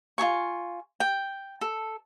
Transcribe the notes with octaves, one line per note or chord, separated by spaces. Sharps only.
F4 G#4 G#5 C#6
G5
A4